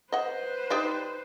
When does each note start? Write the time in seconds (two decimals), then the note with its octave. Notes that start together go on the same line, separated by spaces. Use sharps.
0.12 B4 C5 D#5 F#5
0.70 D#4 G4 D5